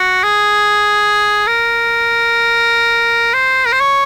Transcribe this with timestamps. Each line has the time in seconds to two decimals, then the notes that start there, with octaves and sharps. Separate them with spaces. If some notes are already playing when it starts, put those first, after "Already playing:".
Already playing: F#4
0.23 G#4
1.47 A#4
3.34 C5
3.66 A#4
3.73 C5
3.80 C#5